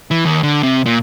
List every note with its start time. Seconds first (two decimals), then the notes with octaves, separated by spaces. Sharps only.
0.11 E3
0.25 D#2
0.43 D3
0.63 C3
0.86 A#2